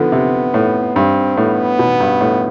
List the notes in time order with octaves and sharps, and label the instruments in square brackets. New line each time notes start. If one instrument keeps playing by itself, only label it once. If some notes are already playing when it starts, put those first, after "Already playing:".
Already playing: [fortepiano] D3 F3 [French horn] B3
[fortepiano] C3
A2
[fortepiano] G2 [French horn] C4
[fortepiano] A2 [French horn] B3
[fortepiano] B2
G2
A2